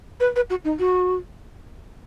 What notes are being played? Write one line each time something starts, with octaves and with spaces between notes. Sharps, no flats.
B4
B4
F#4
D#4
F#4